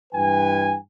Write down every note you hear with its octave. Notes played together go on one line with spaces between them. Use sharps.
G2 E3 B4 G5 G#5